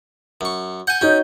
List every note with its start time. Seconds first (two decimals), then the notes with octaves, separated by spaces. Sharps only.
0.41 F#2 C#6
0.87 F#5 G#5 G6
1.01 C#4 D#4 F#4 C#5